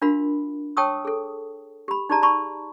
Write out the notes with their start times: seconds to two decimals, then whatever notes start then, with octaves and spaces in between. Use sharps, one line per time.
0.02 D4 F4 F#4 A#4 F5 B5
0.77 C#5 G5 A5 C#6 D#6 E6
1.05 G#4 A4
1.88 G4 B5
2.10 D#4 G4 G#4 D5 A5 A#5
2.22 D5 A5 B5 C#6